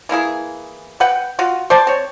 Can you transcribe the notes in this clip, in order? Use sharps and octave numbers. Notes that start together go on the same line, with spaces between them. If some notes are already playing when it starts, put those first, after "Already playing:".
E3 A#3 E4 G#4
B4 F#5 G5
F4 F#4
C5 D5 G5 A5
C4 C#5